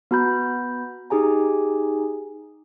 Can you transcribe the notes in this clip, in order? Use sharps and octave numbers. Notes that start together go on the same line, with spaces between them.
B3 F#4 A#5 B5 G6
D#4 G4 G#4 G#5 A#5